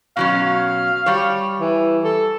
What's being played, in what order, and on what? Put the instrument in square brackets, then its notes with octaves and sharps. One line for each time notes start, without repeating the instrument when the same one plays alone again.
[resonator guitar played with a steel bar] B2 F#3 C#4 [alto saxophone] F5
[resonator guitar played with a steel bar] G3 C#5
[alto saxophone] E3
A4